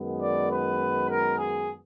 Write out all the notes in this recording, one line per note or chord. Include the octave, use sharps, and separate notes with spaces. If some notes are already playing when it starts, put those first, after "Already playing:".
Already playing: F#2 D#3 G#3 B3
D5
B4
A#4
G#4